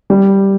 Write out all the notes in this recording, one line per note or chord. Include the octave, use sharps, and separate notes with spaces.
G3